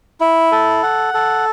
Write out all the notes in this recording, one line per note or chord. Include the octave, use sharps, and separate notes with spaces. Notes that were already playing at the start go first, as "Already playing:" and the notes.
E4
A4
F#5
A4